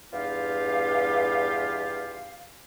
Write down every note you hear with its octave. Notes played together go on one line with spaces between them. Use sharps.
E2 G2 F4 G4 F5